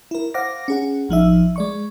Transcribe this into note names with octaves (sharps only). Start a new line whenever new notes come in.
E4 A#4
C5 F5 F#5 D6 A#6
C#4 G#4 F#5
A1 F3 D#4 E5
G#3 D5 C#6